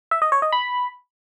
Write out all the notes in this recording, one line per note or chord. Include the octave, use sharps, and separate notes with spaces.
E5
D#5
C#5
D#5
B5